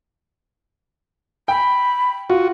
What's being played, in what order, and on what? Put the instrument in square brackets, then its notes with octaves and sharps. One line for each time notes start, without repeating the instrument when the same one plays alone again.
[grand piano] G5 [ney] B5
[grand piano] F4 [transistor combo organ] F#4